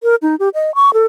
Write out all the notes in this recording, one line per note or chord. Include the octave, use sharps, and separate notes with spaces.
A#4
D#4
G4
D#5
C#6
A4